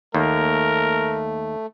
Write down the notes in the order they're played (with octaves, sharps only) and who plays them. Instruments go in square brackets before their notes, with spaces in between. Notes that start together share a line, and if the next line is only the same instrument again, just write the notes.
[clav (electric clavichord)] D#2 [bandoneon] A3 [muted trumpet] A#4